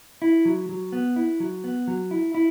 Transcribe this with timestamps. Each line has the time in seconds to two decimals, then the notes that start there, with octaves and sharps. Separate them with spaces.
0.22 E4
0.45 F#3
0.69 F#3
0.92 B3
1.16 E4
1.40 F#3
1.64 B3
1.88 F#3
2.11 E4
2.35 E4